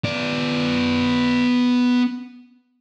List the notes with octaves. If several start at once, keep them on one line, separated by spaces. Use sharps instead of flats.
B3 D5